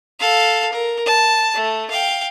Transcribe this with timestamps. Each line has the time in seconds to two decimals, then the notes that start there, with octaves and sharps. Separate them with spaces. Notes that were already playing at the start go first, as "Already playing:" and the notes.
0.19 A4 F5
0.72 A#4
1.06 A5
1.54 A3
1.90 F5 G5